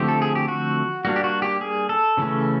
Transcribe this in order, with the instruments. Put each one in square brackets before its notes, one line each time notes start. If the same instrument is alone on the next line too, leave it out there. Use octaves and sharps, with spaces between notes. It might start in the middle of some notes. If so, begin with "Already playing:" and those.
Already playing: [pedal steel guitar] D3 F3 A3 C4 G4
A4
G#4
G4
F#4
G3 A#3 D4 F#4
G4
F#4
G4
G#4
A4
C#3 E3 A3 C#4